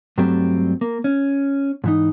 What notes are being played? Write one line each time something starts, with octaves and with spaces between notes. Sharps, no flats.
G2 F#3 G3 A3 C4
A#3
C#4
G#2 E3 D#4